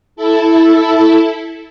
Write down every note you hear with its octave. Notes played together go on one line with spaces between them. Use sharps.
E4 A4